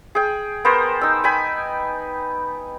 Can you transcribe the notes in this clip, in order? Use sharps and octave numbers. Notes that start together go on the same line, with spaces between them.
G#4 G5
B3 A#4 C5
D#4 E6
G5 G#5 B5